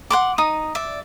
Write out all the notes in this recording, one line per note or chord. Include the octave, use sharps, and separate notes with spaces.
F#5 C6 D6
D#4 D#6
D5 E5